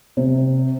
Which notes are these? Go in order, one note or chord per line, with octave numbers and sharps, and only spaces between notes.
C3